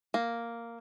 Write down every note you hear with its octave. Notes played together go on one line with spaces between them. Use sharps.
A#3